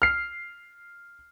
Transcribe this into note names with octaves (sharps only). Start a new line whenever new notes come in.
F6 C7